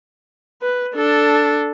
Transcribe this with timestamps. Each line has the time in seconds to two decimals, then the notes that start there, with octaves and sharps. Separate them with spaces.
0.62 B4
0.95 D4 A4